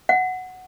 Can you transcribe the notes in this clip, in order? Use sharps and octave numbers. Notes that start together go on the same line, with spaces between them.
F#5